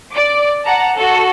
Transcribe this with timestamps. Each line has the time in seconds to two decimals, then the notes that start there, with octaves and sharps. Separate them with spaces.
0.11 D5 D6
0.65 F#5 A5 A#5
0.97 F#4 A4